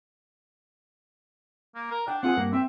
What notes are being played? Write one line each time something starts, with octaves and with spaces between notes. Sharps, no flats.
A#3
A#4
D4 F#5 G5
C4 F4 G#4 F#5
G2 A#3
C4 E5 G5